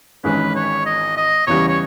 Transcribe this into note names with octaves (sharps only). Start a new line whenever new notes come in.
G#1 G#2 E3 G#3 C#4 B4
C#5
D#5
D#5
E2 C#3 E3 G3 C#5
C#5